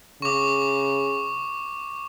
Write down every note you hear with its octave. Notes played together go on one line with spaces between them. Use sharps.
C#3 C#6 D6